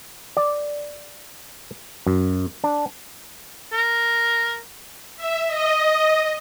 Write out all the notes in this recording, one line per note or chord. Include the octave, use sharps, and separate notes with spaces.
D5
F#2
D4
A#4
E5
D#5